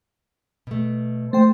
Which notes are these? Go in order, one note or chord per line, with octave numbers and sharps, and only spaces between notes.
B2 A3
A3 C5 G5